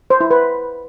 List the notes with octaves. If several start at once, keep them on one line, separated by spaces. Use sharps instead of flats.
C5
E4
B4